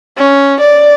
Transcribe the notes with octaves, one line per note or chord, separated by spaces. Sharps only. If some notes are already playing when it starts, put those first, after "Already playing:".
C#4
D5